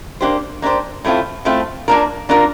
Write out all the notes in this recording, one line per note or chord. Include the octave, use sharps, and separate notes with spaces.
A#3 D4 G4 C5
A#3 D4 G4 C5
A2 A3 C4 F4
A2 A3 C4 F4
A#3 D4 F4 A#4
A#3 D4 F4 A#4